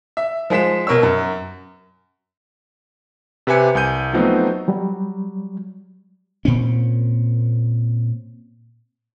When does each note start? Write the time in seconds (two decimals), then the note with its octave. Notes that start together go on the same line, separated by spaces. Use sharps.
0.17 E5
0.50 F3 G#3 B6 E7
0.87 B2 A#4 C#5 E6
1.03 F#2
3.47 C3 G4 B4 E5 G#5 C#7
3.75 C2 G#5 G6 D#7
4.13 F3 F#3 A3 B3 C4 D#4
4.68 F#3 G3
6.45 A#2 C4 C#4